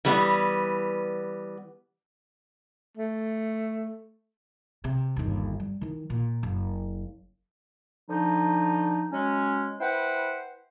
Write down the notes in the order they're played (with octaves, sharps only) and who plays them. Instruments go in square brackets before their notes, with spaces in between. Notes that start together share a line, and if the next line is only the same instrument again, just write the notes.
[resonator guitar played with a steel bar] E3 G3 B3
[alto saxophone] A3
[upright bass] C3
G1 D#2
G3
D#3 E3
A#2
F#1
[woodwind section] D3 F3 D#4
F#3 G#3 C#4
E4 B4 C5 F#5 G5